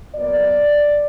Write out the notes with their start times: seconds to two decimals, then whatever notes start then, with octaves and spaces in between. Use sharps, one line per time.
0.15 A#2 F#3 B3 D5